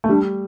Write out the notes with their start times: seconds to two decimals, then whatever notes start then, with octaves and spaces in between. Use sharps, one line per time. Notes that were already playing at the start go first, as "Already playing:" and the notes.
0.04 A3
0.09 G3 D4